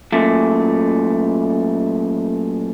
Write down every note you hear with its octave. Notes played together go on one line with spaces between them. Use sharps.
F#2 A#2 A3